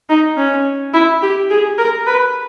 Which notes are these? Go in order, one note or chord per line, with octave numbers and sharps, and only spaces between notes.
D#4
C#4
E4
G4
G#4
A#4
B4